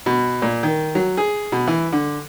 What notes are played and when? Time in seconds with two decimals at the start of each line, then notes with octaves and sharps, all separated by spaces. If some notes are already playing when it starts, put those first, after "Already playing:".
0.06 B2
0.42 A#2
0.63 D#3
0.95 F#3
1.17 G#4
1.52 B2
1.67 E3
1.93 D3